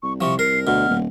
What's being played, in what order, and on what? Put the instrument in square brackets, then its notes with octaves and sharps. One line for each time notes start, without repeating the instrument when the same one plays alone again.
[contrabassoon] C2 [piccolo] C#6
[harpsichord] C3 F3 [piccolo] C#6
[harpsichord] A#4 [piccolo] C7
[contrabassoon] D2 [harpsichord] B2 [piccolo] F6
[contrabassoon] D#1